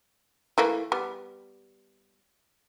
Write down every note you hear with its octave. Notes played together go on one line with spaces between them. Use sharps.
E3 A3 A#3
G3 B3